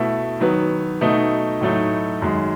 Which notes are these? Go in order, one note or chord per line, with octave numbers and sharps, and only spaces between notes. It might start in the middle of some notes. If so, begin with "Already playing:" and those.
Already playing: B2 A3 E4
D#3 F#3 B3
B2 A3 D#4
A2 F#3 A3 D#4
F#2 D#3 G#3